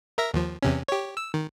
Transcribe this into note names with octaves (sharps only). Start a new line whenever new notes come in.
A#4 E5 A#6
D#2 F3
E2 C3 C#4
G4 C#5
E6
D#3